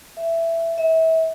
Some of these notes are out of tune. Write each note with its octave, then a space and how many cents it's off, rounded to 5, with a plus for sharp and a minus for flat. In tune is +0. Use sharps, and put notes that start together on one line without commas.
E5 +10
E5 -30